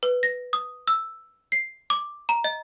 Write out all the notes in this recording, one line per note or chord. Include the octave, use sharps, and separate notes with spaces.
B4
A#6
D#6
E6
C7
D6
A#5
D#5